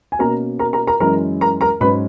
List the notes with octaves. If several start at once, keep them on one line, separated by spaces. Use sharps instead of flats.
G#5
B2 A#3 C#4 A#4 A#5
A#4 A#5
A#4 A#5
A#4 A#5
F#2 E3 G#3 C#4 A#4 A#5
A#4 A#5
A#4 A#5
G#2 F#3 C#4 B4 B5